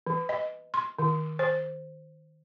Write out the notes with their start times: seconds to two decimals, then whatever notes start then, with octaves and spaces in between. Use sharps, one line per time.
0.07 E3
0.29 D#5
0.74 C6
0.99 D#3
1.39 C5